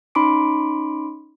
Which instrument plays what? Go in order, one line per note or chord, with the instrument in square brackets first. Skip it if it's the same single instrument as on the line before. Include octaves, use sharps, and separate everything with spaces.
[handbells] C#4 D#4 B5 C6 D6 D7